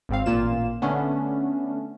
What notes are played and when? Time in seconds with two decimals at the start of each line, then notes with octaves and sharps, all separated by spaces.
0.09 G#1 G#2 C4 F5
0.26 A1 A#2 A#3 F4 E7
0.82 D3 A3 B3 C#4 D4